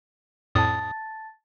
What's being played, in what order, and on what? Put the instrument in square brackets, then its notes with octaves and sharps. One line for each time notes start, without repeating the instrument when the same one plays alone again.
[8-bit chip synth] F2 A2 D#6 [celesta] A5 A6